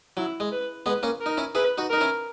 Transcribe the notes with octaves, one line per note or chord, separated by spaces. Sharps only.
F#3 E4
G#3
B4
G#3 B3 B4
A#3 C#4
A#4
D#4
C#4 E4
E4 G#4 B4
D#4 F#4
D#4 A#4
C#4 E4